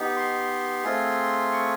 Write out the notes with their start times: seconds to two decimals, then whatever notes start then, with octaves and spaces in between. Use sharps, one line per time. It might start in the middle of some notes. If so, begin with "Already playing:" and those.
Already playing: B3 D#4 G4
0.16 C6
0.84 A3 C4 F4 G#4
1.52 C#6